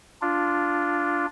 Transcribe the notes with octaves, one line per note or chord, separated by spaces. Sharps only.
D4 F4